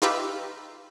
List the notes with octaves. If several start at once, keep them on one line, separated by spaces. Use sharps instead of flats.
D#4 F4 G4 B4 E5